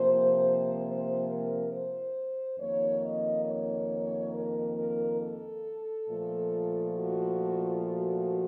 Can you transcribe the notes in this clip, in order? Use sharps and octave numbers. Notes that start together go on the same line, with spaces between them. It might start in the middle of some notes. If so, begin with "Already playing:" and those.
Already playing: C3 F3 A#3 C5
C5
A#4
C5
F2 D#3 A#3 C#5
D#5
C#5
A#4
A#4
A4
A#2 F3 A3
F#4
F#4